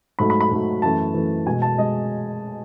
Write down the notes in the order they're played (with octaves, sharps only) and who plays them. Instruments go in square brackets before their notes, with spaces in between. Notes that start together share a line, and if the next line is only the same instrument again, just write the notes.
[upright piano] G#2 F#3 A3 B5
B5
B5
G#2 F#3 A3
F#2 E3 A3 A5
F#2 E3 A3
B2 G#3 G#5
A5
G#3 D#5